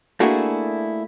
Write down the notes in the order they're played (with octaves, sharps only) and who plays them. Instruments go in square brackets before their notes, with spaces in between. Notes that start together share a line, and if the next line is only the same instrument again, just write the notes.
[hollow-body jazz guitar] A3 A#3 D4 E4 F#4 G#4